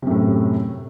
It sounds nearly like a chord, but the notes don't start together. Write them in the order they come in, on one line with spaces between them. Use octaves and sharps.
C3 F#2 A2